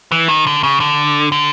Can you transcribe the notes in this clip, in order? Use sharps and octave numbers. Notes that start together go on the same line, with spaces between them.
E3
D#3
D3
C#3
D3
D3